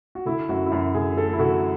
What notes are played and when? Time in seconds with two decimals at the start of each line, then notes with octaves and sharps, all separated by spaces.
0.15 F#4
0.26 D3 E4
0.49 F#2 F#4
0.66 E4
0.72 F#2 F#4
0.94 D3 G#4
1.17 A3 A4
1.33 E4
1.39 D3 F#4